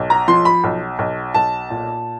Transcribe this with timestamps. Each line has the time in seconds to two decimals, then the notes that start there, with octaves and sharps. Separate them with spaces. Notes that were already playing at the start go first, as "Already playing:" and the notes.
Already playing: B1
0.10 A#5
0.28 F3 C6
0.45 B5
0.64 B1
0.99 B1
1.34 B1 A5
1.70 A#2